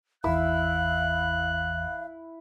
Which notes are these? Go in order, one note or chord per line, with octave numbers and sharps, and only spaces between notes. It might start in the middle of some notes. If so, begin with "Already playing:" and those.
G#1 E2 E3 E4 F5 E6 F#6